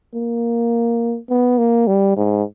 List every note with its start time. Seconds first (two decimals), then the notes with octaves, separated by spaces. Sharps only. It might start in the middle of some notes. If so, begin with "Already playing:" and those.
0.14 A#3
1.30 B3
1.58 A#3
1.87 G3
2.17 G#2